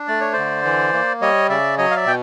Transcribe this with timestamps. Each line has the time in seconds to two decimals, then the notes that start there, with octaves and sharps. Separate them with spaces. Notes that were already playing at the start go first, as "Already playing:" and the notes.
Already playing: D4
0.08 A3 D5
0.21 C#5
0.33 D3 C5 D5
0.65 E3
0.94 A#3
1.21 G3 C#5 D#5
1.49 C#3 D5 E5
1.78 F#3 C#5 D#5
1.91 F5
1.96 D5 E5
2.06 B2 G5